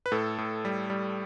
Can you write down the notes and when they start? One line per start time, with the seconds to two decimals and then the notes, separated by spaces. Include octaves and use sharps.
0.06 B4
0.12 A2 A4
0.38 A2
0.65 G3
0.90 G3